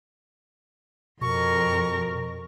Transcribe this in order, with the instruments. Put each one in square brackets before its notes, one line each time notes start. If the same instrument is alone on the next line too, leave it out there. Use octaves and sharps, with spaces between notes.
[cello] F2 A#4 [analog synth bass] B2 [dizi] C#6